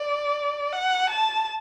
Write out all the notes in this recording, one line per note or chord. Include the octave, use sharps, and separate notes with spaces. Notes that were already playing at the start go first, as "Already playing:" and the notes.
Already playing: D5
F#5
A5